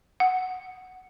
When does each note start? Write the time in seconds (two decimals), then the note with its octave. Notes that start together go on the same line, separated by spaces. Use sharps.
0.20 F#5